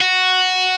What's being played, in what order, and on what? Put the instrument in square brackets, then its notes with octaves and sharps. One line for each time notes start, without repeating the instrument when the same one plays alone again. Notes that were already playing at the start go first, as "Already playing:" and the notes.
[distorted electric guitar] F#4